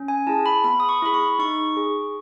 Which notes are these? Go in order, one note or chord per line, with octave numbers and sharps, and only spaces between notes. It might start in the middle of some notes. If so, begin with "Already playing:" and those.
Already playing: C#4
G#5
E4 G#4 A5
B5
B3 B5
D#6
C#6
E4 G#4 B5
C#6
D#4 C#6
G#4